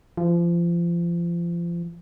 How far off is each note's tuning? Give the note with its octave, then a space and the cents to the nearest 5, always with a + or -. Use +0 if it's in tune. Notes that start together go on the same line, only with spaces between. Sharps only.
F3 -30